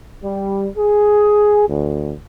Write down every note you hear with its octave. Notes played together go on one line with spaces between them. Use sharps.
G3
G#4
D2